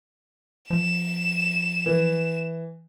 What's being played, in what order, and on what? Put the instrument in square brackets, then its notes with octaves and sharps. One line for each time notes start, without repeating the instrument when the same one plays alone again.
[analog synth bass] F3 [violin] E7
[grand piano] E3